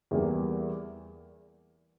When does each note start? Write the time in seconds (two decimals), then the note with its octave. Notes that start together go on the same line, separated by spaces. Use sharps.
0.11 E2 E3 G3 A#3